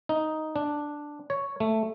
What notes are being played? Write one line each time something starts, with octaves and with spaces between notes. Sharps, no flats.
D#4
D4
C#5
A3